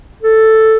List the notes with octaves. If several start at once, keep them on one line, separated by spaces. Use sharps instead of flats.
A4